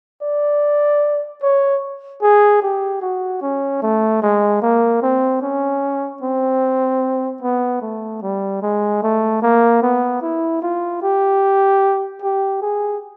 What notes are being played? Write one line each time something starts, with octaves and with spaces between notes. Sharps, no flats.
D5
C#5
G#4
G4
F#4
C#4
A3
G#3
A#3
C4
C#4
C4
B3
A3
G3
G#3
A3
A#3
B3
E4
F4
G4
G4
G#4